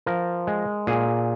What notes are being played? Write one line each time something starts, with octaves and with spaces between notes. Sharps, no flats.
F3 A#4
G#3
A#2 G#4